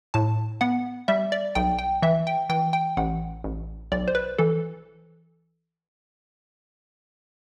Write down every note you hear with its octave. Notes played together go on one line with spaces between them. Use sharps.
A2 A5
B3 F#5
G3 E5
D5
B1 G5
G5
E3 E5
G5
E3 G5
G5
A1 F#5
A1
B1 D5
C5
B4
E3 A4